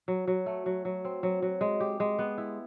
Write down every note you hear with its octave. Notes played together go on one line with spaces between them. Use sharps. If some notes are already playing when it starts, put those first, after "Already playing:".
F#3
F#3
A3
F#3
F#3
C4
F#3
F#3
G#3
G4
G#3
B3
E4